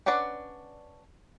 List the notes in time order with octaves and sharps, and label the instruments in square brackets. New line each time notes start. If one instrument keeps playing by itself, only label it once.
[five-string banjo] C#4 D4 B4 D5 F#5